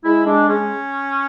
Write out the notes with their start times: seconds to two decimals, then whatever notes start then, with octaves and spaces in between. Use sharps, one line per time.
0.04 G#3 E4
0.26 G#3 D4
0.49 G#3 C#4